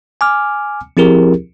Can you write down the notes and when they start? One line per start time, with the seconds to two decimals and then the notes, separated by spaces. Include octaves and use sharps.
0.21 G#5 D6 F6
0.97 F3 C4 E4 G4 G#4 A#4